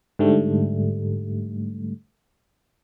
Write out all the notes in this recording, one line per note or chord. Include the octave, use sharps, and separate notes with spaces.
G#2 D3 G3 A3